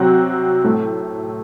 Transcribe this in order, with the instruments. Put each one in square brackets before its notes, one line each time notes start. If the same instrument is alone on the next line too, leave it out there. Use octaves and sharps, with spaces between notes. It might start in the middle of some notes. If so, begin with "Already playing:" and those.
Already playing: [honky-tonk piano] C3 F#3 C4 F#4
A2 A3